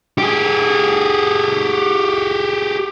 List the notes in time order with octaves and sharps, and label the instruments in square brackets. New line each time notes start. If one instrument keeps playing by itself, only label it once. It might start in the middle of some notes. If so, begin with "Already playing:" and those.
[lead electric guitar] G4 G#4